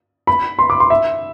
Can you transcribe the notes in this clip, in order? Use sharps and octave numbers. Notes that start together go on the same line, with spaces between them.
B5
C6
D6
C6
E5